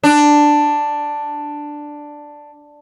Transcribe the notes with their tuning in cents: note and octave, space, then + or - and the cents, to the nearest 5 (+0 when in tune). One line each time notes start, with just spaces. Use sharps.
D4 +5